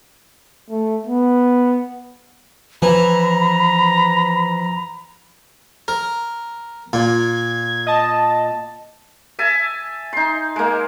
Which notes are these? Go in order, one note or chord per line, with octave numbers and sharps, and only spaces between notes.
A3
B3
E3 F3 A#5 B5
A#4
A#2 G#6
D#5 A5
E5 G#5 A5
D#4 C6
G#3 A#3